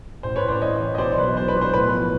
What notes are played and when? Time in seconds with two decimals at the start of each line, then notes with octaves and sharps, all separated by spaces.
0.23 A1 C5
0.36 B4 C#5
0.42 A1
0.48 C5 D5
0.61 E3 C#5 D#5
0.81 E3
0.95 D#5
0.98 B2 C5 D5
1.17 B1 B4
1.36 B2 C5
1.48 B4
1.56 B2
1.61 C5
1.74 A2 B4
1.93 F3